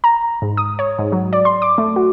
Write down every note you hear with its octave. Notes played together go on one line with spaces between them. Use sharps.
A#5
G#2
D#6
C#5
G#2
F#3
D5
C6
D6
A3
F#4